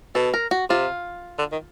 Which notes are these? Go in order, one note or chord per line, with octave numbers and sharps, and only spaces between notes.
B2 A4
A#4
F#4
C3 F4
D3
D#3